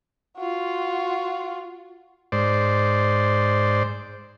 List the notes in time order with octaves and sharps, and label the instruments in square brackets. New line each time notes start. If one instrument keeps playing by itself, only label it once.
[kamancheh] F4 F#4
[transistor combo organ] G#2 C5 D5